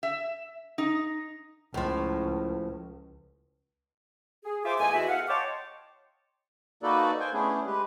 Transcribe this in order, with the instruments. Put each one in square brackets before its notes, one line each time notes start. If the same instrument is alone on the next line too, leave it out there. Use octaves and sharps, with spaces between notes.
[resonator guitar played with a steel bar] E5
D#4
[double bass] C#2 [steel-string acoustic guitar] A2 F3
[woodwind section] G#4
F4 G#4 C5 E5 C6 D6
E2 A3 D#5 G#5
E2 F#4 E5
F5 F#5
C#5 D#5 G5 A5 C6 D6
[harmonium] A#3 D#4 F#4 A4 B4 D5
C5 G5 G#5
A3 B3 C#4 D4 E4 G#4
G#3 G4 B4